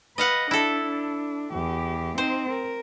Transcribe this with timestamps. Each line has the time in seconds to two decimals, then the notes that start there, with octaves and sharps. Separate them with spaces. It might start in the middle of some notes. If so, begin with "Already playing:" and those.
0.18 B4 D#5 F5 F#5
0.51 D4 E4 A4
0.85 D4
1.53 E2 G4
2.18 C4 D#4 C5
2.50 A#4